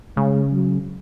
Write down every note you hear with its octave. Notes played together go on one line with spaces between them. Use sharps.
C#3 G#3
F#3